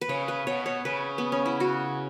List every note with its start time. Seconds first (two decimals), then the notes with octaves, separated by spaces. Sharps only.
0.01 B4
0.09 C#3 C#5
0.28 B4
0.47 B2 C#5
0.66 C#5
0.85 C#3 B4
1.18 B3
1.32 C#4
1.46 E4
1.60 F#4